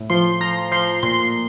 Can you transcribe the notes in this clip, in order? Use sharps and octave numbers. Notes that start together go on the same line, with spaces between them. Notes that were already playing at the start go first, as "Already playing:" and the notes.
Already playing: A2
F3 C6
F3 A#5
F3 C6
A#2 C6